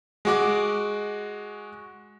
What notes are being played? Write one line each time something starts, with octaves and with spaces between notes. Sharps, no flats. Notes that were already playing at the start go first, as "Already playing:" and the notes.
G#3 F#4 D6